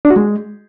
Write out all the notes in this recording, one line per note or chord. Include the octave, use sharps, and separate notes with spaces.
D4
F#4
G#3